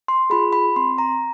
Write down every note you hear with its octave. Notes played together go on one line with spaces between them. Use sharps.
C6
F4 G#4 B5
B5
C4 C6
A#5